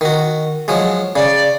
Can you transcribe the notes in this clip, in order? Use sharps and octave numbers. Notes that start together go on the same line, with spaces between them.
D#3 F#4
F3 F#3 G#3
C#3 D5